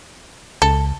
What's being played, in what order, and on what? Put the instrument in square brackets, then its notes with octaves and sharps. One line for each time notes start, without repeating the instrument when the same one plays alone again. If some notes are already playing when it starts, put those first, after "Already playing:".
[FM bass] C#2 [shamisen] A4